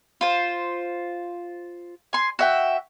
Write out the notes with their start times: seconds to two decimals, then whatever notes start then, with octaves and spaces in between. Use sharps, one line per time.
0.21 F4 C5
2.13 G#5 C6
2.39 F#4 E5 G5